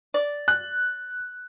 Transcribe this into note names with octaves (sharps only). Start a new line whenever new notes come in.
D5
F#6